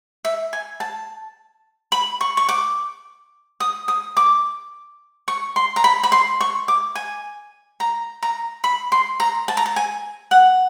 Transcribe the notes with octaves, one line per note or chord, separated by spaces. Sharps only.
E5
G#5
A5
B5
C#6
C#6
D6
D#6
D#6
D6
C#6
C6
A#5
B5
B5
C6
C#6
D6
G#5
A#5
A#5
B5
C6
A#5
A5
A#5
A5
G#5
F#5